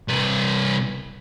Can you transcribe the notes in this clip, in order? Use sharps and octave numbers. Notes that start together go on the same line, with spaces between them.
C2 B4